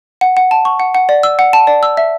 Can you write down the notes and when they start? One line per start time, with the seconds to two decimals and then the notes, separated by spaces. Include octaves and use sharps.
0.21 F#5
0.37 F#5
0.51 A5
0.65 C#6
0.80 F#5
0.95 F#5
1.09 D5
1.23 E6
1.39 F#5
1.53 A5
1.67 D5
1.83 E6
1.97 E5